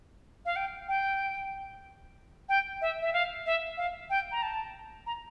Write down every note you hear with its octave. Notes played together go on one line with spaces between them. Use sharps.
F5
G5
G5
G5
E5
E5
F5
E5
F5
G5
A#5
A5
A#5